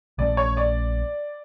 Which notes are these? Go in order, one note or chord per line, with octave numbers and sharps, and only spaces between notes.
A#1 A#2 A3 C#4 D5
C#5
D5